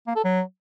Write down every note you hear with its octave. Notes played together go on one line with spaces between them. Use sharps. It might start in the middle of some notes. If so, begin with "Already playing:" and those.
A#3
A4
F#3